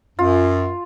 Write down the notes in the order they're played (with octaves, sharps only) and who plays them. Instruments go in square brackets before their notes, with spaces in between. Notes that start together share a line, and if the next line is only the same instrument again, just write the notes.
[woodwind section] F#2 [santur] F4